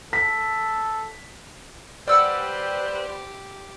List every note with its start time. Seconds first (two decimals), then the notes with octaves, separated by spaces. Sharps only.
0.13 A4 B6
2.08 G3 G4 B4 C5 D5 F#5 E6 F6